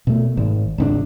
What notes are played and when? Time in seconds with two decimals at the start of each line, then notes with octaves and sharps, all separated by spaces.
0.07 B2 A3
0.37 G#1
0.78 G#1 C#2 D4